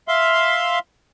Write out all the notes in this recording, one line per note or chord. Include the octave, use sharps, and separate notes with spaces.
E5 F5 C6